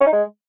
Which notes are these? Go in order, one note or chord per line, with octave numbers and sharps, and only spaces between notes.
C#4
D#4
G#3